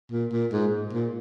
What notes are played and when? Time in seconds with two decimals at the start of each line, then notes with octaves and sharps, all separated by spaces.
0.12 A#2
0.33 A#2
0.53 G#2
0.93 A#2